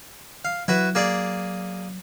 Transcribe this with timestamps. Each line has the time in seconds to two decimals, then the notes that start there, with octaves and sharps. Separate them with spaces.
0.45 F5
0.68 F#3 E4 F#4 B4
0.95 A#3 G#4 D5